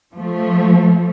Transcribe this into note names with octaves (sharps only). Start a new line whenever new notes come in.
F3 A3